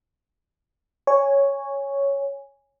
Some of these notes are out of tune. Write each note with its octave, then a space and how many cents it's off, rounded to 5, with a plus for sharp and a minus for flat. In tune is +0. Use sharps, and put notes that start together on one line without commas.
C#5 +0 G#5 -15